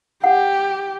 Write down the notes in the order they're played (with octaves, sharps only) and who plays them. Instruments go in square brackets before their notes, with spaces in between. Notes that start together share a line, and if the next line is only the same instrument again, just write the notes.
[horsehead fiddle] G4 [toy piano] F#5